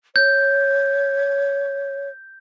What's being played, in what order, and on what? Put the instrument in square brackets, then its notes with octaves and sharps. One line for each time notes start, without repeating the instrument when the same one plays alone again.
[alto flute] C#5 [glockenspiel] G6